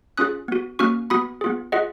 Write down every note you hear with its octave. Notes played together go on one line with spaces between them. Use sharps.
C#4 F4 G#4 D#6 F#6
B3 F#4
A#3 C#4 F#4 C#6 F6
B3 F#4 B5 D#6
B3 F4 G#4
F4 G#4 D#5 F#5